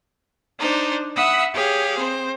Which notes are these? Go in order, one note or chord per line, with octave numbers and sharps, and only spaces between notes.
D4 D#4 C5
E5 F#5 B5 D#6 E6 F#6
G4 G#4 C#5 F5
C4 C5